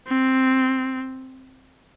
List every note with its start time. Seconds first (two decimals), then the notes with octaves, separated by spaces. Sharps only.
0.08 C4